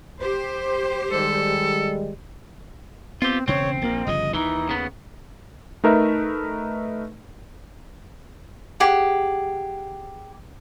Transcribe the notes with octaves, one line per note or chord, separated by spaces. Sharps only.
G4 C5
D#3 G3 G#3 A4
B3 C4 F4 G4
E1 C#3 C4 C#5
A#1 A#3
G1 C#3 F3 D#5
D#2 E3 D#4
C#3 B3
A3 D#4 A#4 B4 E5
G4 G#4 F#5